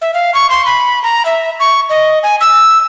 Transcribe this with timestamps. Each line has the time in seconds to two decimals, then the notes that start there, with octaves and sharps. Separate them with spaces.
0.02 E5
0.14 F5
0.34 C#6
0.50 C6
0.66 B5
1.03 A#5
1.25 E5
1.60 C#6
1.90 D#5
2.23 G#5
2.41 E6